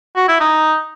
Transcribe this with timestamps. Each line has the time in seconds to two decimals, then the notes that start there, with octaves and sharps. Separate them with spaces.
0.16 F#4
0.28 E4
0.41 D#4